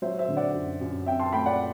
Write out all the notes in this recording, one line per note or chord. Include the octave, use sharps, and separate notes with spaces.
F#3 C5 E5
C5 E5
D3
D5 F#5
F#2
F#2
C4 E5 G5
A5 C6
A3 G5 B5
D5 F#5